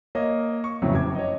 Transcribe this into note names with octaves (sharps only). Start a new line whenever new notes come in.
A#3 C#5 D#5
C#6
F2 A2 C#3 E3 F#3
F#1 D6 G#6
C#5 D#5